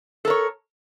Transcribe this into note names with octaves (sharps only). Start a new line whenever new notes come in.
A4 A#4 C#5